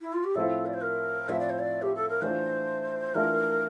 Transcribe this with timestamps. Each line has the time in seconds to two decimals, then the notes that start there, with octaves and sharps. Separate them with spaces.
0.01 E4
0.13 F4
0.24 G4
0.35 A2 F3 C4 E4 A4
0.66 D5
0.74 C5
0.82 A#4
1.28 A2 F3 C4 E4 E5
1.39 D5
1.50 C5
1.59 D5
1.82 G4
1.95 A4
2.09 A#4
2.22 E3 A3 D4 F4 C5
3.15 E3 A3 D4 F4 A#4